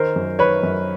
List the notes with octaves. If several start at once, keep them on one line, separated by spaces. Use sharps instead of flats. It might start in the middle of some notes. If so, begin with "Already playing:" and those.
Already playing: D#3 A#4 C5
F#2
D#3 B4 C#5
F#2